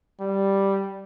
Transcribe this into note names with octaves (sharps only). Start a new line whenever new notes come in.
G3